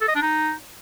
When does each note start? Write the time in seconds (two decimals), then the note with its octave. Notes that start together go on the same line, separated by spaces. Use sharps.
0.01 A4
0.08 D#5
0.15 D4
0.22 D#4